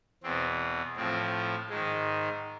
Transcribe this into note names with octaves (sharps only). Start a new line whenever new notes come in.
E2 B2 C4
A2 F3 C4
G#2 D#3 G#3